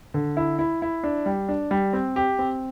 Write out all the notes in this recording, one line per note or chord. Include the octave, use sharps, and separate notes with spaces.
D3
E4
E4
E4
D4
G3
D4
G3
C4
G4
C4